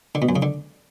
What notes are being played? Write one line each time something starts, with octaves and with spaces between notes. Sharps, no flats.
D3
B2
F#2
C#3
D3